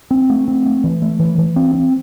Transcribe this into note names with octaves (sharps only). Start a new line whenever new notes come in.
C4
A3
C4
A3
E3
A3
E3
E3
C4
C4